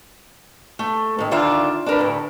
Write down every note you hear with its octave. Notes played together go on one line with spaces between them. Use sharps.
A3
A2 D#3
D3 D#3 D4 F4 E5 F5
D4 A#4 B4
D2 A2